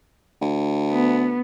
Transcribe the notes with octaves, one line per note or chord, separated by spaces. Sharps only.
D2
B3